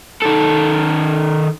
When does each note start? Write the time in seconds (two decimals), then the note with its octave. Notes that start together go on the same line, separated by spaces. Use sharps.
0.22 D#3 A4